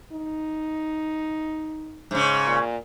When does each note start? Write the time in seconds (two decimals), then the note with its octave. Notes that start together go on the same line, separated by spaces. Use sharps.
0.12 D#4
2.11 G#2 C#3
2.47 A#2